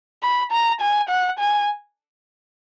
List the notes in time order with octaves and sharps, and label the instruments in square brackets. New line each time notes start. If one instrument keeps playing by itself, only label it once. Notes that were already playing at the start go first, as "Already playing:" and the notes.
[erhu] B5
A#5
G#5
F#5
G#5